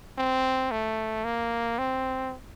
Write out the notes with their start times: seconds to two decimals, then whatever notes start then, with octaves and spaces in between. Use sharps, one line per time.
0.18 C4
0.71 A3
1.24 A#3
1.78 C4